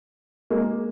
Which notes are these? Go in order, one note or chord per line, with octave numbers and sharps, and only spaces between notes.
G#3 A#3